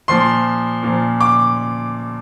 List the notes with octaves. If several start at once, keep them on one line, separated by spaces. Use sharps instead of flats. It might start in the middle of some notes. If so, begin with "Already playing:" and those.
A#2 F3 C6
A#2 F3
D6